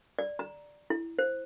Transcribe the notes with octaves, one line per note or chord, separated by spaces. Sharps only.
D5
A#5
E4
C5